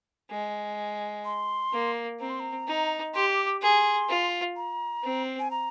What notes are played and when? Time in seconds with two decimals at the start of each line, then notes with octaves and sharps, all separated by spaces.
0.31 G#3
1.25 C6
1.73 A#3
2.20 C4 A#5
2.30 C6
2.40 A#5
2.67 D#4
3.15 G4 C6
3.30 D6
3.46 D6
3.62 G#4 C6
4.09 F4
4.56 A#5
5.04 C4
5.39 G#5
5.51 A#5